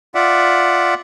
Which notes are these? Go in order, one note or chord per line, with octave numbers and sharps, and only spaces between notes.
F4 D5 E5 F#5